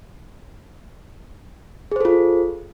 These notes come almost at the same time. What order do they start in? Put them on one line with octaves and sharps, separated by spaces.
G#4 C5 A4 F4